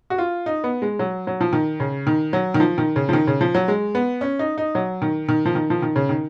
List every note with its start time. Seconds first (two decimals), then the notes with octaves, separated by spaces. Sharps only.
0.10 F#4
0.18 F4
0.46 D#4
0.64 B3
0.82 G#3
0.99 F#3
1.27 F#3
1.41 F3
1.53 D#3
1.80 C#3
2.07 D#3
2.33 F#3
2.54 D#3
2.60 F3
2.78 D#3
2.96 C#3
3.09 F3
3.13 D#3
3.27 C#3
3.41 F3
3.55 F#3
3.68 G#3
3.95 B3
4.21 C#4
4.39 D#4
4.58 D#4
4.75 F#3
5.02 D#3
5.29 D#3
5.46 F3
5.55 D#3
5.70 F3
5.82 D#3
5.96 C#3
6.09 D#3